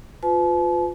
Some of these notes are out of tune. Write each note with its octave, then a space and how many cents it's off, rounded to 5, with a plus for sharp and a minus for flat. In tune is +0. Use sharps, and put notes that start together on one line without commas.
F4 +15 B4 +30 A5 -40